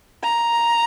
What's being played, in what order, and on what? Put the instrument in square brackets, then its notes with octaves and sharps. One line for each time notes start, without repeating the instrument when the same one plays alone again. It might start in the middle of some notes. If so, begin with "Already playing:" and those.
[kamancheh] A#5